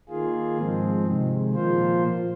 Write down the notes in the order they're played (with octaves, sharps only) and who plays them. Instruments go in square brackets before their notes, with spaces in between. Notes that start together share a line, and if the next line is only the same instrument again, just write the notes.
[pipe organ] D#3 A#3 F4 G#4
G#2 F3 G#3 C4
C3 D#3 G#3
A#2 F3 A#3 F4 C5